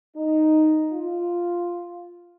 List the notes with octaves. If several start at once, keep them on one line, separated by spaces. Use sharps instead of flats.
D#4
F4